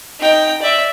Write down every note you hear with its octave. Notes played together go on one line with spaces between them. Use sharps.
D#4 G5
D5 E5